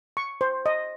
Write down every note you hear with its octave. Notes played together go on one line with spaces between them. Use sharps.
C#6
C5
D#5